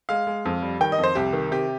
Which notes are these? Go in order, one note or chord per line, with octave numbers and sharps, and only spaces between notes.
G#3 F5
G#3
F2
G3
D#3 G5
D#5
F2
C5
C2 G4
D#3
C3 G4